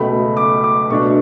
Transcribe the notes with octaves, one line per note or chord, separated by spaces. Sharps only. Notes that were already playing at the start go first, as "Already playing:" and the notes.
Already playing: C#2 B2 A3 B5
D6
D6
B2 A3 D4 C#6